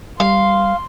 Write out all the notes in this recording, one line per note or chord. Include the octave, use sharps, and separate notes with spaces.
G3 F5 C6